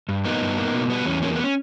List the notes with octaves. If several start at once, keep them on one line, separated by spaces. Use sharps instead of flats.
G2
A#3 B3 D#4
G2
A#3
B2
G3 B3
E2 C#4
A#3 C#4
B3
C#4